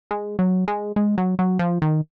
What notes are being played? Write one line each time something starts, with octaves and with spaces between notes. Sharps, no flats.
G#3
F#3
G#3
G#3
F#3
F#3
F3
D#3